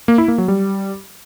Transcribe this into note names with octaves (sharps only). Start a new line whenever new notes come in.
A#3
E4
A#3
F#3
G3